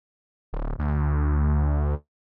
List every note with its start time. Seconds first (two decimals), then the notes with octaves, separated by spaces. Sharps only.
0.53 D1
0.79 D2